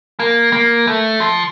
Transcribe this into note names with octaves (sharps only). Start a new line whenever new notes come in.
A#3
A#3
A3
F3